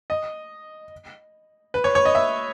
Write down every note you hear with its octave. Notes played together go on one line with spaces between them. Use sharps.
D#5
B4
C#5
C#5
D#5
E5